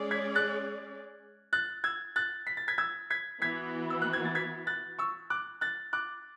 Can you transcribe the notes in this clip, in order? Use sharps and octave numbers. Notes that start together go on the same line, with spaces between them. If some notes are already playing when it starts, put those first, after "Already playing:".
Already playing: G#3 C#4 G#4 D5
G#6 B6
F#6 A6
F#6 A6
E6 G#6
F#6 A6
B6
A6
G#6 B6
E6 G#6
G#6 B6
E3 B3 F#4 G#6 B6
E6
F#6
G#6
A6
G#6 B6
F#6 A6
C#6 E6
D6 F#6
F#6 A6
D6 F#6